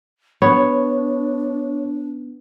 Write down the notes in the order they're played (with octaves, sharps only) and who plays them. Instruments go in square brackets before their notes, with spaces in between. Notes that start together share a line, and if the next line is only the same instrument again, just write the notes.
[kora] B3 [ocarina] D4 [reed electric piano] C#5